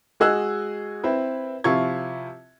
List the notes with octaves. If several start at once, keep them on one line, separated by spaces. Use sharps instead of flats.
G#3 F#4 G#4 D#5 E6 F#6
C4 E4 B4
C3 F3 E4 F4 C#6 G#6